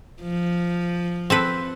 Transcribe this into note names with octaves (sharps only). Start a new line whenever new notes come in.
F3
C4 A4 B4